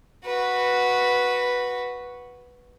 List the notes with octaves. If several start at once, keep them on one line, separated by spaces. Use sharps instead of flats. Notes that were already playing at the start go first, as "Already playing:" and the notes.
F#4 B4